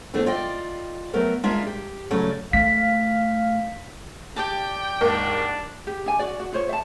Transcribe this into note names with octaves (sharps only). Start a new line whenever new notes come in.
F2 E3 A3 B3 D4
F4 D5 D#5 G5
F#3 A3 B3 A#4
G#3 A#3 D4 F4 D5 E5
G4
C#3 F#3 A3 C#4 D5
A3 F5 B6
G4 D5 G5 A5
D#2 G#2 A#3 D4
G4
D4 G#5
F#4 D5
F#4
F4 C5 C#5
E5 A5